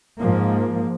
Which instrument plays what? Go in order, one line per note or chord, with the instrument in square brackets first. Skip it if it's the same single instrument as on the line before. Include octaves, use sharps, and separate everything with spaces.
[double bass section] G#2 F3 A#3